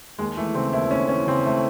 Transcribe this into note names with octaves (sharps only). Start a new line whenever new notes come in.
D#2 G#3
E3 A3
C#3 C4
D#2 E4
D#2 C#4
E3 C#4
C#3 C4
A3